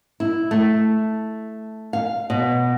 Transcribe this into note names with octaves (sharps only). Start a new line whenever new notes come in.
E4
A3
F5
B2